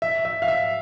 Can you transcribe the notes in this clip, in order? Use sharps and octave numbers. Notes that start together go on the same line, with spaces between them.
E5
E5
F5
E5